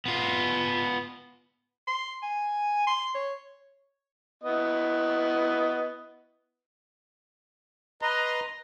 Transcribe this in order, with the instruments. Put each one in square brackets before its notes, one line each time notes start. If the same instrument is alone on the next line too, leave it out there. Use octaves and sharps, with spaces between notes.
[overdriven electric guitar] B3 F4
[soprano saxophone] C6
G#5
C6
C#5
[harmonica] B3 E4 D#5
[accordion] B4 D#5 C6 [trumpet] A#5